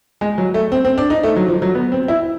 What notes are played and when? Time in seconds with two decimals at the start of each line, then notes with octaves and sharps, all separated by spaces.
0.21 G#3
0.38 F#3
0.54 A3
0.72 C4
0.85 C4
0.98 D4
1.10 D#4
1.23 A3
1.36 F#3
1.48 F3
1.62 F#3
1.75 B3
1.92 C4
2.08 E4